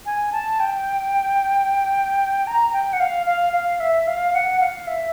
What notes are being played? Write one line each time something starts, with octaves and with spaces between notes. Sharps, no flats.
G#5
A5
G5
A#5
G5
F#5
F5
F5
F5
E5
F5
F#5
F5
E5